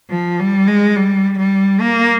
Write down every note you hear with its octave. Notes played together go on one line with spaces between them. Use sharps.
F3
G3
G#3
G3
G3
A#3